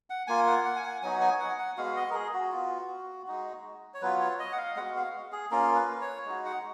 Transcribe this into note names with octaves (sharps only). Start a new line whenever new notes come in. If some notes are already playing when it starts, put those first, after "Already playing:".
F#5
A#3 F4 G#5
F#5
F#5
G#5
F#5
F#3 B3 D#4 F#4 G#5
G#5
F#5
F#5
G#3 B3 F#4 F5
D#5
A#4
G#4
F#4
B3 F4
G#3 D#4 F#4
C#5
F#3 B3 F4 B4
C#5
D#5
F#5
F5
G#3 B3 F#4 F#5
F5
G#4
A#3 C#4 F4 A#4
B4
C#5
G#3 D#4 F#4
F#5